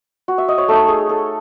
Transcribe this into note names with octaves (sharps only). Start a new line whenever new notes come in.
F#4
E5
D#5
C#5
A3 D#4 A4
G#4
A4